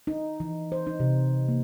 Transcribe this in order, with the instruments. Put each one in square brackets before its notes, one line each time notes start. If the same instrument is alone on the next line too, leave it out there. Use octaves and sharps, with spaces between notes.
[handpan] D#4
E3
C5
D#4
C3
A#3